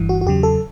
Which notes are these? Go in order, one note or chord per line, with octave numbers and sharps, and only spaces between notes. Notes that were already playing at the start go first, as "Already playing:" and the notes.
Already playing: G1 G2 E3
F#4
F#4
E2 C#3 F#3 G4
A4